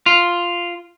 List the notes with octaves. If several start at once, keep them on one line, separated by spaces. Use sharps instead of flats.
F4